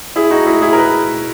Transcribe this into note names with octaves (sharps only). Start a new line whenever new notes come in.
E4 G#4
D#4 F#4
E4 G#4
E4 G#4
A#4
G#4 B4